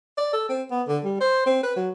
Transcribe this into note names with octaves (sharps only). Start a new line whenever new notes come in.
D5
A4
C4
B3
D3
G3
C5
C4
B4
F#3